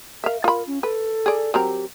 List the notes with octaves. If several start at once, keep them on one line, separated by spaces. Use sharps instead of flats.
A#4 E5 F5
F4 A#4 B5
C#4
A4 B4
G#4 D5
F#3 C4 G4 A#4